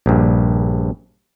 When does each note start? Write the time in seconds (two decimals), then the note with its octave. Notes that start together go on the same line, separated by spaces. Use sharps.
0.06 A#1 G2